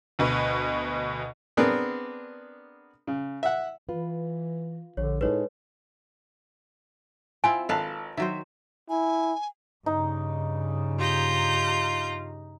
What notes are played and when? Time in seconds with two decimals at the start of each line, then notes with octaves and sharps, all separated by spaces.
0.19 D2 B2 B4
1.57 B3 C4 D4 G#4 A#4
3.07 C#3
3.43 E5 F#5
3.89 E3 F4 B4
4.97 A#1 D3 C#5
5.21 A2 G#3 D#4 A4 B4 C#5
7.44 C4 E4 F4 G#5
7.69 G#1 A4 B4 F5 A5
8.17 D#3 F#3 C5 E5
8.90 E4 G#5
9.86 G2 C#3 D#4
10.99 F4 G4 A#5 G6